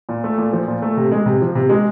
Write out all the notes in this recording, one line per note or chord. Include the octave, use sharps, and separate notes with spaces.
A#2
A3
A#2
F3
A#2
A3
C3
G#3
C3
F3
C3
G#3